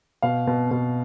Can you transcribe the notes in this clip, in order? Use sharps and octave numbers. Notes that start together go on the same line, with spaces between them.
B2 F5
B2
B2